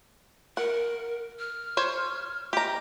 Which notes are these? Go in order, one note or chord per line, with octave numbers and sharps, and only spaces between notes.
A#4 F#5
F6
C5 C#5
G4 D#5 A#5